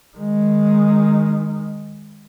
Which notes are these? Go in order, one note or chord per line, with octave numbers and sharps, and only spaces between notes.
D#3 G#3